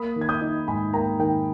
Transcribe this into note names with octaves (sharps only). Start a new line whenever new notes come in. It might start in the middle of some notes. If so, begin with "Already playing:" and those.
Already playing: A#3 B5 D#6
D#3
G#6
D#6 G6
D#4
G#2 G#5 B5
A#3 G5 A#5
D#3 G5